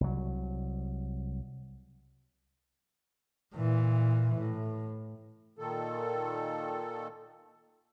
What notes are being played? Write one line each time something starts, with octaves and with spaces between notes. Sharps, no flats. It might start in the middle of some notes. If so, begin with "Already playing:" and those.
C2 F#3
A#2 E3
A2
A#2 D#3 A4